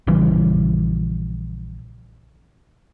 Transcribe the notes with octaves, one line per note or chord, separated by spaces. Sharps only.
A#1 C#3 E3 G3